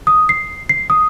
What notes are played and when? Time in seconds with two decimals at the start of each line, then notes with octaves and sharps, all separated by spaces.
0.07 D#6
0.29 C7
0.69 C7
0.90 D#6